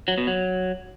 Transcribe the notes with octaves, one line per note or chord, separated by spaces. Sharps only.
F#3
B2
F#3